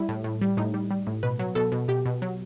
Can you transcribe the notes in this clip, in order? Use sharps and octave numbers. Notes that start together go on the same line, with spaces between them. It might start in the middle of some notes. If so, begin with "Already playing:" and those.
Already playing: G3 E4
A2
A2
G3
A2 D#4
G3
G3
A2
B2 B4
F#3
B2 A4
B2
B2 G4
B2
F#3